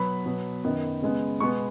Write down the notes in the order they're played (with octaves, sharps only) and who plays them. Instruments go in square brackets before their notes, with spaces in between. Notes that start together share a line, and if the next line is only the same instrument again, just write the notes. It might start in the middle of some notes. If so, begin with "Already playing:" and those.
Already playing: [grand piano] B2 F#3 B3 B5
B2 F#3 B3
F#2 D#3 B3
C#3 G#3 B3
B2 G#3 B3 C#6